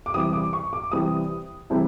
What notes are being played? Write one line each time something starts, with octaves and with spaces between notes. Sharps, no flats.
D6
C3 E3 G3 C4 E4 D#6
D6
C#6
D6
C3 E3 G3 C4 E4 D#6
C3 E3 G3 C4 E4